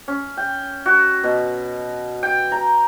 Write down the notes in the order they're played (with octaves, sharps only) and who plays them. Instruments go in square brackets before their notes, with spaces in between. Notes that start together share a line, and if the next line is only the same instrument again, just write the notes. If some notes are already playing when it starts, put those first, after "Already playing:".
[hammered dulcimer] C#4
G5
F#4
B2
G5
A#5